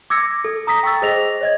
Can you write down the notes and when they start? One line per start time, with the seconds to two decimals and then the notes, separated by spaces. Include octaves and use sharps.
0.10 D6 E6 G#6 A#6 C#7
0.44 A4
0.67 A#5 D#6 A#6 B6
0.83 G5 C#6 D#6 E6 A6
1.02 G#4 C5 D#5 A#6 F7
1.41 C#5 D#5 G#6